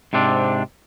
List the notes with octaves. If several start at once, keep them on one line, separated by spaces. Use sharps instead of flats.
G#2 C3 C4 D4